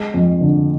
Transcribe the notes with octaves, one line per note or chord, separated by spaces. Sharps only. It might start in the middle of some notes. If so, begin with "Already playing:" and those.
Already playing: G#3
F2
D3